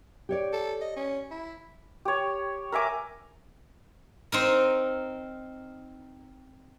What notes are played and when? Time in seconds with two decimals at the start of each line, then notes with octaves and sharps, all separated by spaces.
0.29 G4 C#5 D5
0.53 A4
0.81 D#5
0.96 C#4
1.31 E4
2.05 G4 C#5
2.72 A#4 E5 G#5 D6
4.32 C4 D#4 A#4